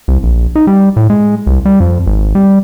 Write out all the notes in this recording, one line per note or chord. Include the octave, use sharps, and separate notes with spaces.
C2
A#1
D#4
G3
A2
G#3
C2
G3
F2
G#1
G3